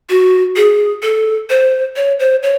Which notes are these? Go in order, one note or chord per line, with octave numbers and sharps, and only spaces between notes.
F#4
G#4
A4
C5
C#5
C5
C#5